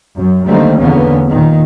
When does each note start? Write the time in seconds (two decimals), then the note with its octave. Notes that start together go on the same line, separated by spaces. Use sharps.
0.17 F#2
0.46 D3 D#3 G3 A3 A#3 C4
0.80 E2 D3 A#3 B3 C#4
1.29 A#2 D#3